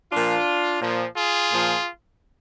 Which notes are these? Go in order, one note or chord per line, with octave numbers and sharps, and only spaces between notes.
A#2 F3 D4 F4
A#2 F3
F4 G#4
A#2 F3